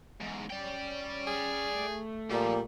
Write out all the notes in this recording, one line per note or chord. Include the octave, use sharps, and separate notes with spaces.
E2 G#2
C#4 D5 G5
G#4
A3
A#2 F3 G3